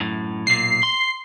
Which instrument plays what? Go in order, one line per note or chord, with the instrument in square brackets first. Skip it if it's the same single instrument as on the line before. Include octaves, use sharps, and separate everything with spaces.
[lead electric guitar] F#2 A2
[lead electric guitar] B1 A#2 [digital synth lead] C7
[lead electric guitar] C6